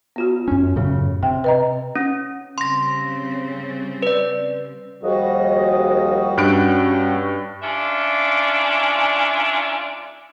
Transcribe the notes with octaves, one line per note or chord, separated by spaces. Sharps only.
B3 F4 F#4
F#2 C#4
F#2 A2 C#3
C3 G5
B4 D#5 A#5
C#4
C#3 G3 C4 C6 A#6
B4 D5
D#2 F3 G3 F#4 G#4 D#5
G2 C#4 F#6 D7
G#2 C#4 D4 F4 D5 E5